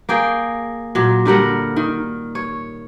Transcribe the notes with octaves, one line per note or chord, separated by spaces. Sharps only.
A#3 G#4 G5
A#2 F#3
D3 G3 A#4 F#5
D#3
C#5